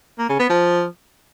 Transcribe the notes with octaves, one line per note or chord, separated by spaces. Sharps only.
A#3
C#3
B3
F3